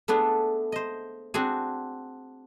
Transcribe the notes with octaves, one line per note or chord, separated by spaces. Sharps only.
A3 B3 D4 G#4
C5 D#5
C4 D4 F#4 G#4